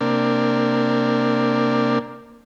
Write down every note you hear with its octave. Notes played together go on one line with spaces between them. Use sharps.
C3 A#3 D4